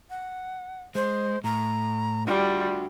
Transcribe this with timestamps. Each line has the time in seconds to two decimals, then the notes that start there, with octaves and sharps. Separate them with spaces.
0.10 F#5
0.95 G#3 C5
1.44 A2 A#5
2.27 G3 D4 F4 F#4